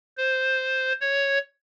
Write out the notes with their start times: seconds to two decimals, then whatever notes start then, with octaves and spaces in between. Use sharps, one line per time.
0.17 C5
1.01 C#5